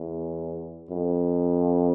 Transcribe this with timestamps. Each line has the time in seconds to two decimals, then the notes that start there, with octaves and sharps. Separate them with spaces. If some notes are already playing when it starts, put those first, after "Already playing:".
Already playing: E2
0.91 F2